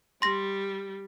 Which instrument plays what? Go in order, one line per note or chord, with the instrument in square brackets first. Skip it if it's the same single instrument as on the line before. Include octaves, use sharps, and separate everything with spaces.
[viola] G3 [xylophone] C6 A#6